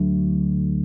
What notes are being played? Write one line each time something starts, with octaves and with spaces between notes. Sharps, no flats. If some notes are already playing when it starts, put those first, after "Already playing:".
Already playing: D2 D3 F#3 A3